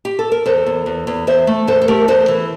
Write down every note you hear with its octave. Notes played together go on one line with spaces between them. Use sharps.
G4
A4
A#4
E2 A4 C5
E2
E2
E2
E2 C5 E5
A3
E2 A4 C5
A4
A3 G4 A#4
E2 A4 C5
E3